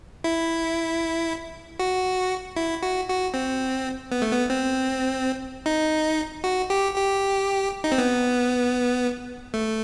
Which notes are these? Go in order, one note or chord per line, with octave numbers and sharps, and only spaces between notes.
E4
F#4
E4
F#4
F#4
C4
B3
A3
B3
C4
D#4
F#4
G4
G4
D#4
C4
B3
A3